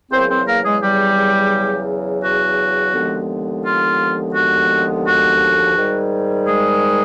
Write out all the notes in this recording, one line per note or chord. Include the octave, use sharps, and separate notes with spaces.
E2 C#3 F#3 A#3 C4 C5
C4 C5
A#3 A#4
G#3 G#4
G3 G4
F#4
D#2 D3 F3 G#3 B3
F4
F#4
F#4
G#2 D#3 G3
G#3 G#4